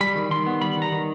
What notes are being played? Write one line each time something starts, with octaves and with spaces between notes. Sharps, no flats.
G3 B5
D#3
D#3 C6
B3
G3 B5
D#3
A#5
D#3